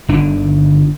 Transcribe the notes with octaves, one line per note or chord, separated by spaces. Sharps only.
G1 D3 D#3 D4